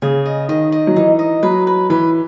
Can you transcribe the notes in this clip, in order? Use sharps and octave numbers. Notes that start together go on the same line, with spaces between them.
C#3 G#4
D#5
D#3 D#5
D#5
F#3
E3 D#4
D#5
F#3 B4
B4
E3 B4